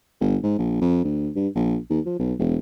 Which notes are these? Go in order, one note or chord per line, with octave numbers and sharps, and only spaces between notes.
G1
G#2
A#1
F2
D2
G2
A#1
D#2
F3
B1
E1